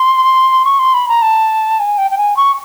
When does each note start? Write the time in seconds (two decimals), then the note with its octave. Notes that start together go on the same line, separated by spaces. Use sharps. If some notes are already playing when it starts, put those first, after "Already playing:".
Already playing: C6
0.65 C#6
0.79 C6
0.94 B5
1.08 A#5
1.22 A5
1.80 G#5
1.98 G5
2.11 G5
2.18 G#5
2.37 C#6